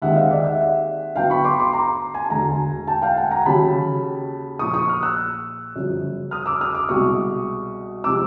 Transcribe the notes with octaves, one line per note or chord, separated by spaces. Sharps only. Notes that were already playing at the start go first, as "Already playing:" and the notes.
D#2 D#3 G#3 C4 E5 F#5
D#5 F5
D5 E5
E5 F#5
D3 F#3 B3 D4 F5 G5
B5 C#6
C6 D6
C6 D6
A#5 C6
G#5
A5
E1 D2 D3 G#5 A#5
G5 A5
F5 G5
F#5 G#5
G#5 A#5
D#2 C#3 F#3 A5 B5
A#1 A#2 F3 C#6 D#6
C#6 D#6
D#6 F6
E6 F#6
G1 F#2 C#3 F3
D#6 F6
D6 E6
D#6 F6
D6 E6
C2 B2 G#3 C#6 D#6
C3 F3 G#3 D6 E6